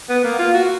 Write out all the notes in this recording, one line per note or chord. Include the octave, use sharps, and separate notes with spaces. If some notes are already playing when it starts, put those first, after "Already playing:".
B3
A#3
F4
F#4